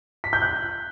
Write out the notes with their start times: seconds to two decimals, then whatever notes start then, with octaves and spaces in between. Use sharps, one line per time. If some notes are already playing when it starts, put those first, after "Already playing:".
0.24 B6
0.33 G6
0.42 F#6